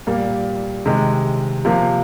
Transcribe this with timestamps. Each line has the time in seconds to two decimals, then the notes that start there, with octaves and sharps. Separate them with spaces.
0.07 A#2 G3 A#3
0.86 C3 D#3 G#3
1.65 C3 F3 A#3